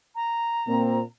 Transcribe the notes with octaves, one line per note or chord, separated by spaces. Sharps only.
A#5
A#2 A#3 C4